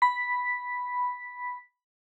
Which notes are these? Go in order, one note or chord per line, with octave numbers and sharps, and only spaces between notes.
B5 B6